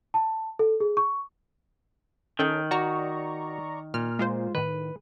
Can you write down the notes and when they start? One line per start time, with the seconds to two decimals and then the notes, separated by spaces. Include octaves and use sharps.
0.14 A5
0.59 A4
0.80 G#4
0.97 C#6
2.39 D#3 C#4 A4 G5
2.71 F#4 D5 A#5 C#6
3.94 A#2 F6
4.19 G#3 F4 C5
4.55 A2 D#3 B4